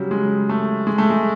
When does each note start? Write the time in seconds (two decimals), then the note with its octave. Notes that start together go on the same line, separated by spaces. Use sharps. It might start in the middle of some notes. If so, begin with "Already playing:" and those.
Already playing: C#3 F#3 G3
0.11 G#3
0.49 A3
0.87 G#3
0.98 A3
1.10 G#3